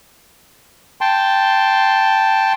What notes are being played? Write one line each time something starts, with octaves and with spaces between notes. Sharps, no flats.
G5 A5 C6